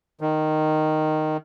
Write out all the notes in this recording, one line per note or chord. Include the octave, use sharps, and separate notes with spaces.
D#3